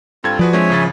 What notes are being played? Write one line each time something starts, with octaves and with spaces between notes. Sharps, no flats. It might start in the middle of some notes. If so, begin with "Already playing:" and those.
G2 C4 F4 A4 G#6
F3 F#4 G#4 B4 D5
G#3 C4 D4 C#5 E5 G#5
G#1 C#3 A6